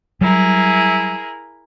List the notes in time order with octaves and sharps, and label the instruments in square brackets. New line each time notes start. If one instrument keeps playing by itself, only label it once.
[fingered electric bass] F#3 G3 [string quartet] E4 G#4 A#4